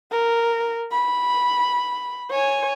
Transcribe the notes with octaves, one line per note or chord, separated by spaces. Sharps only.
A#4
B5
C#5 G#5